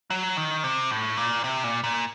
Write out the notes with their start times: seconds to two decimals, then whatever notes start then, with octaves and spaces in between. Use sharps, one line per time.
0.10 F#3
0.37 D#3
0.64 C3
0.91 A2
1.17 A#2
1.44 C3
1.64 A#2
1.84 A#2